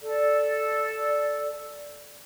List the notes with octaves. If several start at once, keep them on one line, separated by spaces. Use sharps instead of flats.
A4 D5